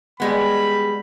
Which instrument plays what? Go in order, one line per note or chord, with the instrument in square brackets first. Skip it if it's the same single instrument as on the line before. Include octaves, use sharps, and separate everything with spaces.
[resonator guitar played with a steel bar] G3 G#3 B3 [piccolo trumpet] B5